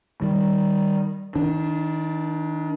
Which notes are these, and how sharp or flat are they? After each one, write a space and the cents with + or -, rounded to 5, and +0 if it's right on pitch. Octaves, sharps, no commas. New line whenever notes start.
D#3 +0 G3 +0
D#3 +35 D4 +0